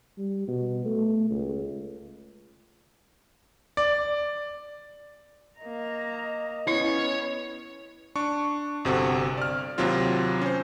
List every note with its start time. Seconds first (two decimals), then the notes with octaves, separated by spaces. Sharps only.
0.18 G3
0.48 B2
0.85 A3
1.30 C#2
3.77 D5
5.59 A#3 D#5 A#5
6.67 B3 C#4 E4 C#5
8.15 D4 C#6
8.85 G1 C3 C4 F#4 A4
9.37 D5 F6
9.78 D#2 C3 F#3 C4 F4
10.41 C#4 C5